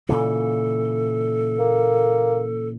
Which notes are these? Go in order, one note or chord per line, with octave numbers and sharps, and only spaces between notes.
A#2 C#3 E3 A4
A#3